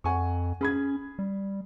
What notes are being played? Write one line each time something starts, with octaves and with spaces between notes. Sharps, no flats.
F2 F#5 G#5 C#6
C#4 G#4 B5 G#6
G3